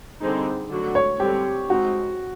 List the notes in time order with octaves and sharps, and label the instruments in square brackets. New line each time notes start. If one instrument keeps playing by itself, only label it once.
[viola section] D3 G3 C4 D#4 G#4
D3 F#3 A3 D4 F#4
[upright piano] C#5
[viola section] D3 G3 C4 [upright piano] G4
[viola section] G#3 C4 D#4 [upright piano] F#4